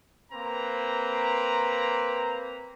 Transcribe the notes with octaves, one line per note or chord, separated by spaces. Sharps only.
A#3 C4 B4 A#5